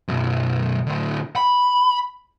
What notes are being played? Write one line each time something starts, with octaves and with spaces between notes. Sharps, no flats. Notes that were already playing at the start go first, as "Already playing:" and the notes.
B1 F#2
A2 D3
B5